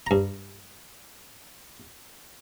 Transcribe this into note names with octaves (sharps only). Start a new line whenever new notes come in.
G2 A#5